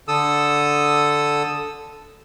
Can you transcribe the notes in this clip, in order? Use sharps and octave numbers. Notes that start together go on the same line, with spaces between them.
D3 A4 D#6 E6